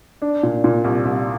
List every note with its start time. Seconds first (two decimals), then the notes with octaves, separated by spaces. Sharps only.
0.22 D4
0.43 A#2
0.64 A#2
0.84 C2
1.05 C2